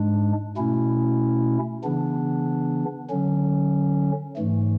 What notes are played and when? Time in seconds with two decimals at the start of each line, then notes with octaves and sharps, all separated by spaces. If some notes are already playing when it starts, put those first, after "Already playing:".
Already playing: G#2 G#3 D4
0.57 B2 A3 C#4 E4
1.84 C#3 E3 B3 D4
3.10 D3 F#3 C#4
4.37 G#2 E3 A3